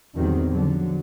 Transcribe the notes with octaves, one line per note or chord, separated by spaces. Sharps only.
E2 A2 D#3 F#3 G3 C4
D3 F3 F#3